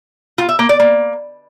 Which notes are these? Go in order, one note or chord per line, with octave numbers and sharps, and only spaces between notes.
F4
E5
A#3
D5
A#3